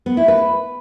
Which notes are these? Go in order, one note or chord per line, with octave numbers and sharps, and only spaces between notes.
B3
E4
B4